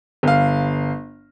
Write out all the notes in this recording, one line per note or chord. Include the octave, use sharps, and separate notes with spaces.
G1 F5